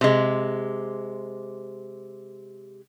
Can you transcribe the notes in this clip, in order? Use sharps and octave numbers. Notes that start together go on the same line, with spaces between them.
C3 G#3